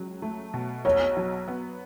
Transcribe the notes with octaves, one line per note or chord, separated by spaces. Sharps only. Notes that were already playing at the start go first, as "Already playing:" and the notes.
Already playing: C#2 F#3
A3
B2
B1 C#5
F#3
B3